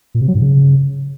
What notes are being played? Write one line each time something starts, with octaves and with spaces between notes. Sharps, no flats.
A#2
C3
F#3
G#2
C#3